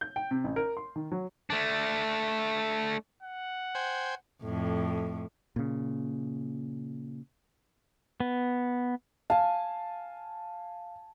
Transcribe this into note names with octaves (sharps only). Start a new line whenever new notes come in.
G6
G5
C3
A1
A#4
C6
D#3
F#3
A3 D4
F#5
C5 G5 G#5
F2 A2
A#2 C#3
B3
F5 G#5 A5